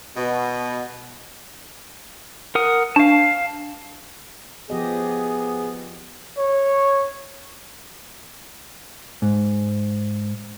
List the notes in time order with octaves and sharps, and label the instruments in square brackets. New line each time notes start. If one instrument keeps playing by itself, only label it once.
[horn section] B2
[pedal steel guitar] A#4 F#5 D#6
[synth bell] D4 [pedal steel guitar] F5 A5
[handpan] F3 G4 D#5 [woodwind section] B3 [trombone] G#4
[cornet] C#5
[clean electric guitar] G#2